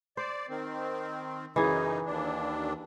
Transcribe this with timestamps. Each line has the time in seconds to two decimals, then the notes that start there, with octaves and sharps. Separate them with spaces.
0.17 C5 D5
0.49 D#3 C4
1.56 F#2 C#3 E3 D#4 G#4
2.06 D#2 D4